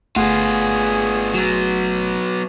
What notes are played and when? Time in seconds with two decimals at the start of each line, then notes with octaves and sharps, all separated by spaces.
0.16 G1 A3 B3 F4 G#4 F#5
1.34 F#3 B3